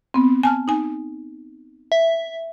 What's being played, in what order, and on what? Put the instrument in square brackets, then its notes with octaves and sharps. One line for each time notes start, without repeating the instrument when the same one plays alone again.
[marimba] B3 C4
G#5 A5 F6
D#4 G#5
[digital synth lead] E5